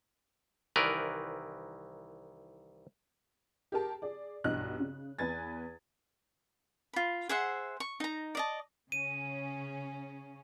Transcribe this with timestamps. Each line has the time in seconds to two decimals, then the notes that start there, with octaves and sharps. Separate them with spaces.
0.76 C2 D#3 E3 A#4 B4 D5
3.72 G4 G#4 A#4 A5
4.02 G#4 D5
4.44 B1 G2 E3 D#5 F#6
4.80 C#3
5.19 E2 B4 G#5 G#6 A6
6.93 F4 B5
7.29 G#4 C5 E5 F#5
7.80 C#6
8.00 D#4 A#5
8.35 D5 D#5 A5
8.92 C#3 C#4 D#7